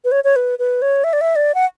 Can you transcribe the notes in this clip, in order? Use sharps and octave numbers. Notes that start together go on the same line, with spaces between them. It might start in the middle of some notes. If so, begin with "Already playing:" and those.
B4
C#5
C#5
B4
B4
C#5
E5
D5
E5
D5
F#5